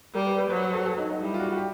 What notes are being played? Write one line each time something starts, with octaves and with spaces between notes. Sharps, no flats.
G3 A#4
B4
B4
F#3 C5
B4
A4
A4
D#4
D#4
G3 E4
F4
F#4
F#4
G4